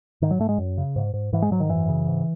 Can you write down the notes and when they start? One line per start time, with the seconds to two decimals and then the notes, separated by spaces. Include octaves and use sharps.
0.22 G#2 D#3
0.31 F#3
0.39 G#2 A3
0.49 G#3
0.58 F#2
0.78 C#3
0.96 G#2
1.14 G#2
1.33 G#2 E3
1.42 G#3
1.51 G#2 F#3
1.60 D#3
1.70 F#2 E3
1.89 C#3
2.07 G#2